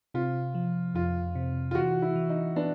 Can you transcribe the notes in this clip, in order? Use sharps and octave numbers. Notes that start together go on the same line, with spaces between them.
C3 F4
F3
F2 F4
C3
F4
E3 F#4
E4
E3
D#4
B3 D4